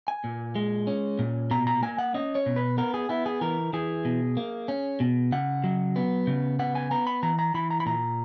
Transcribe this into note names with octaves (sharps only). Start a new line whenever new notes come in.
G#5
A#2
G#3
C#4
A#2
B2 A#5
A#5
A#3 G#5
F#5
C#4 D#5
C#5
B2
B4
B3 A#4
G#4
B3 E4
G#4
E3 A#4
E3 G#4
B2
A#3
C#4
B2
C#3 F#5
F#3
B3
C#3
B3 F#5
G#5
B3 A#5
B5
E3 A#5
A#5
E3 B5
A#5
B5
A#2 A#5